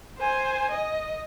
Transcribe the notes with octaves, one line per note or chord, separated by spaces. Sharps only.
C5 G#5
D#5